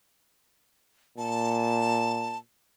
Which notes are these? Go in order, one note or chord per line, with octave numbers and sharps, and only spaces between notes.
A#2 A5